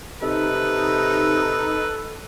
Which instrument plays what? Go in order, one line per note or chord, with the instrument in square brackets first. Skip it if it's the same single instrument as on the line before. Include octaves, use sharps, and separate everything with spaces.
[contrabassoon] C3 [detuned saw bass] D#4 [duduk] A4 [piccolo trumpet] B4